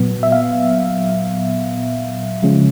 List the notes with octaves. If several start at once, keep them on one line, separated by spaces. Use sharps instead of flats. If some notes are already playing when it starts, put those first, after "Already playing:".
Already playing: A#2 F#3 B3
E5
F5
C#3 F3 G#3 C#4